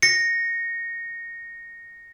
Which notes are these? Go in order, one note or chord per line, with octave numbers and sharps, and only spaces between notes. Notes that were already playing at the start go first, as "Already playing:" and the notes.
A#6 C#7